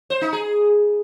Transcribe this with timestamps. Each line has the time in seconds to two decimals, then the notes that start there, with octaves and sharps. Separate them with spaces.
0.10 C5
0.21 D#4
0.33 G#4